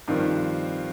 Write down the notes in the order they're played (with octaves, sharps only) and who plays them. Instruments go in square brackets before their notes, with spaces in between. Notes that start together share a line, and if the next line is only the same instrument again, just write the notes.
[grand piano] G2 F3 C4 F4 [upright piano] D#3